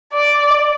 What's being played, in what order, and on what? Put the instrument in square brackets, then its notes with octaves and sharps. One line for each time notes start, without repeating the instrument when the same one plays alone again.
[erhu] D5